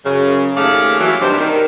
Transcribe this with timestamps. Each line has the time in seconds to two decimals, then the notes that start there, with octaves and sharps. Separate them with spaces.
0.05 F#2 C#3
0.57 D#2 A3 C#4 G#4 D5 F5
1.00 E3 F#3
1.22 G2 C3 D#3 D4 C5
1.39 D#3